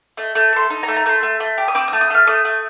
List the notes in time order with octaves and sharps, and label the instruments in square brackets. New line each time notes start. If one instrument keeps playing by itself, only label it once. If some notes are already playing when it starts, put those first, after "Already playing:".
[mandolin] A3 D#5
A3
A4 C6
D#4
A#5
A3
A#5
A3 C6
A3
A3
G4
D#6
C4 D6
D#6
A3
D#6
A3 F6
A3 D#6
A3